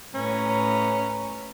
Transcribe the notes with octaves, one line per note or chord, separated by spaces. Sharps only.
A2 C#4 B4 A#5